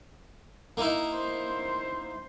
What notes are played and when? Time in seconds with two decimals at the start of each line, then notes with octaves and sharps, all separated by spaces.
0.77 A#3 D#4 E4
1.15 C5